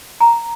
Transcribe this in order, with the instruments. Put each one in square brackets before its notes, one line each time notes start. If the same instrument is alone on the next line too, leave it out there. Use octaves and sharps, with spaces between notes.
[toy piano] A#5